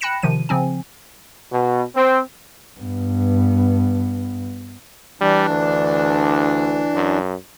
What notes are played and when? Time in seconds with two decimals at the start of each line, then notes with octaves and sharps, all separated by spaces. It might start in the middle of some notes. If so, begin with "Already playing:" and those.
0.01 G5 B5 F#6 A#6 C#7 E7
0.22 C3 D#3 F3 D#7
0.49 C#3 F3 C4 G#5
1.52 B2
1.96 C4
2.79 G2 B3
5.21 E3 G3 D4
5.50 D2
6.95 F#2